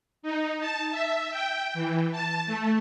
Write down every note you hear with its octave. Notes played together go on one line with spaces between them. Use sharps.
D#4
A5
E5
G5
E3
A5
A3